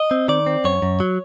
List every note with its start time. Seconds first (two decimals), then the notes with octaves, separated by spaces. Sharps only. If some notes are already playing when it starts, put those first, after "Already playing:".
Already playing: D#5
0.11 C4
0.28 D#3 D5
0.46 C4
0.64 F#2 C#5
0.82 F#2
1.00 F#3